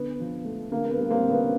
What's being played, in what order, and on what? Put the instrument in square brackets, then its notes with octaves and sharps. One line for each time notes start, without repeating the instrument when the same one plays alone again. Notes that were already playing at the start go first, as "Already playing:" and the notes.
Already playing: [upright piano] D3 B3
F3
A3
D3 A#3
A#3
B3
G3
A#3 C4
D3
B3 C#4